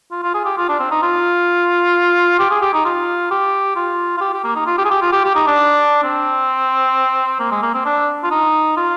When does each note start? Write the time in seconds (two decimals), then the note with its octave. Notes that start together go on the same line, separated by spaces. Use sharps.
0.11 F4
0.23 F4
0.34 G#4
0.45 G4
0.57 F4
0.69 D4
0.79 C4
0.91 D#4
1.02 F4
2.39 G4
2.51 G#4
2.62 G4
2.73 D#4
2.85 F4
3.31 G4
3.76 F4
4.17 F4
4.21 G4
4.33 G4
4.44 A#3
4.55 D#4
4.66 F4
4.78 G4
4.84 G#4
4.90 G4
5.01 F4
5.12 G4
5.24 G4
5.35 D#4
5.47 D4
6.04 C4
7.39 A#3
7.51 G#3
7.62 A#3
7.74 C4
7.85 D4
8.23 F4
8.31 D#4
8.77 F4